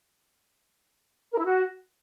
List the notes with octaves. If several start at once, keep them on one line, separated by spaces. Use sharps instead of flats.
A#4
E4
F#4